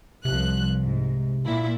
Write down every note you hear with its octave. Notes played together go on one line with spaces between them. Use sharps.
C2 C3 F3 F#6
G#2
A#2 E4